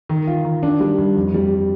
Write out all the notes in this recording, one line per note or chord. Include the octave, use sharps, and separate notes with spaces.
D#3
F4
D#3
D4
G3
G2
F2
G3